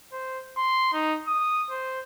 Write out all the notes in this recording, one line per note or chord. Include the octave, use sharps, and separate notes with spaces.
C5
C6
D#4
D#6
C5